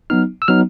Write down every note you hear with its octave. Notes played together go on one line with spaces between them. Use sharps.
F#3 B3 D#4 F6
E6
F#3 B3 D#4 F6